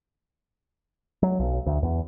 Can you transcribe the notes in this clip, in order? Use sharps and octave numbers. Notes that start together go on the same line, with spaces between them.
F#3
B1
D2
E2